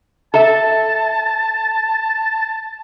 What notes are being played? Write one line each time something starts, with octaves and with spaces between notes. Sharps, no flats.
A4 E5 A5